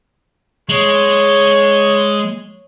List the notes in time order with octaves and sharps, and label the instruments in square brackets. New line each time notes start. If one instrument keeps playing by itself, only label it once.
[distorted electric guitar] G#3 [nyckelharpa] C#5